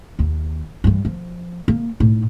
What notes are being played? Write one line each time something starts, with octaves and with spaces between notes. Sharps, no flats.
D#2
G2 E3
F3
A#3
A2 D#4